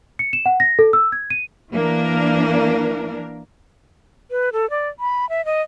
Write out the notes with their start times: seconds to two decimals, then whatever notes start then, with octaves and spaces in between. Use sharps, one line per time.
0.19 C#7
0.33 E7
0.46 F#5
0.60 A#6
0.79 A4
0.93 E6
1.12 G#6
1.30 D#7
1.73 E3 A#3 D4 A#4
4.31 B4
4.53 A4
4.70 D5
5.00 B5
5.29 E5
5.45 D#5